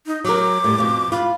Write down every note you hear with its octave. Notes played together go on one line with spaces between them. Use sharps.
D#4
F#3 A#4 D6
A2 G3
F2 B2
F4 B5